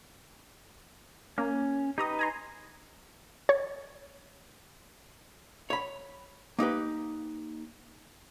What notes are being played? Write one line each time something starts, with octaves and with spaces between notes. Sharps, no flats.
A#3 C#4
D#4 G4 B4 A#5 D#6
G#5 A#5 C6
C#5
C#5 B5
A#3 D#4 G4 B4